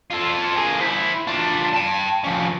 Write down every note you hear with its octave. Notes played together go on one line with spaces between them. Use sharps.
F4 A4
A#3 G#4
E4 C5
D4 F4
G5 A5
F3 C#4